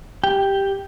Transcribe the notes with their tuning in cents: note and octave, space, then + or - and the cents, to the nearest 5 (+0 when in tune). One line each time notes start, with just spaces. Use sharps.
G4 +0 G5 +5